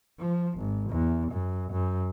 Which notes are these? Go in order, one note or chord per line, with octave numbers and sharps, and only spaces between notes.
F3
G#1
E2
F#2
F#2